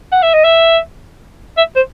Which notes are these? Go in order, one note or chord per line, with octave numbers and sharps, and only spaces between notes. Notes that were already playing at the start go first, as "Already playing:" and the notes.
F#5
E5
D#5
E5
E5
C5